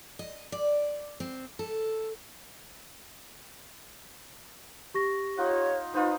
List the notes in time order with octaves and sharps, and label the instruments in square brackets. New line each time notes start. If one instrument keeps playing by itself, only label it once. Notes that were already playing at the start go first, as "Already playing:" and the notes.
[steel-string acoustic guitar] D#5
D5
C4
A4
[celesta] G4 C#6 A#6
[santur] D#4 F4 F#5 [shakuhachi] C#5
[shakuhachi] D#4 [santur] F4 B4 C5 [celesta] D#6